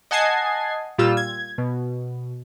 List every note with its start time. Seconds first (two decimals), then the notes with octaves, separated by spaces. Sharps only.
0.11 D#5 F#5 G#5 A5 G#6 C7
0.98 A#2 G3 F4 E6
1.17 G#6
1.58 B2